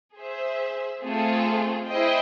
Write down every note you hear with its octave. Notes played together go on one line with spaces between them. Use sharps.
G#4 C5 E5
A3 C4 F4 G#4
E4 G#4 C5 D#5 G5